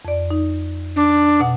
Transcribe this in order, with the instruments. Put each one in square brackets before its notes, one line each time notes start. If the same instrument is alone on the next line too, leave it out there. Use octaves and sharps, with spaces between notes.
[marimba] F2 D5
D#4
[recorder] D4
[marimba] B2 F#5